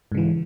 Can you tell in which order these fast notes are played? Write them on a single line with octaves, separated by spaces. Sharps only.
G#2 C#3 E3